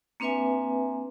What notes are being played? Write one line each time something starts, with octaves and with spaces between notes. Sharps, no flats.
A#3 C4 D4 B4 E5 G#5